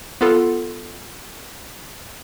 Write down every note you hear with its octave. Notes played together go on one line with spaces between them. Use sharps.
B3 F4 A4